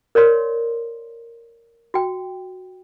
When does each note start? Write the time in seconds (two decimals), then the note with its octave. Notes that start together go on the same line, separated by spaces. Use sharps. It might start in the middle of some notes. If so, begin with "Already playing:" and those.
0.15 A#4 C#5 D5 C6
1.94 F#4 G5